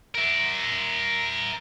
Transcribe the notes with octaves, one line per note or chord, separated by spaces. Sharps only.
A#4 E5